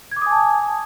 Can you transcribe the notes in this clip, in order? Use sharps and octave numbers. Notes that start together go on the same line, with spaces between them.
G#5 A5 D6 D#6 G#6